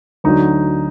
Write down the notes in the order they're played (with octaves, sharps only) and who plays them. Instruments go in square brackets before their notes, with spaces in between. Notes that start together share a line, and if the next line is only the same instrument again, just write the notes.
[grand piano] D2 D3 F#3 D#4